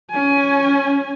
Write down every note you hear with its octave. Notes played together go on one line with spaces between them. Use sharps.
C#4 G#5